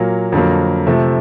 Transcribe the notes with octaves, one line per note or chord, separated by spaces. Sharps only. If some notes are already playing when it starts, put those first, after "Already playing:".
Already playing: A#2 F#3 A#3
F2 D3 F#3 A#3
C3 F3 A3